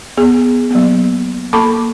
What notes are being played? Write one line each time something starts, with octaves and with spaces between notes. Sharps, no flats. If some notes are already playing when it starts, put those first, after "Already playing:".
B3 G#4
F#3 A#3 B3
A#3 A4 A5 B5 C#6 D6